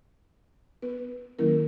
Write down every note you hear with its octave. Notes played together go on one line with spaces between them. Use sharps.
B3 B4
D#3 F#3 A#3 C#4 E4 A#4